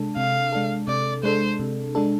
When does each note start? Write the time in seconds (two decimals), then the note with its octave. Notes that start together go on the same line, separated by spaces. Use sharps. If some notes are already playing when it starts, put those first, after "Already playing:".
Already playing: C3 G#3 D4 A4
0.17 C3 F5
0.52 G#3 D4 A4
0.88 C3 D5
1.23 G#3 D4 A4 C5
1.60 C3
1.95 G#3 D4 A4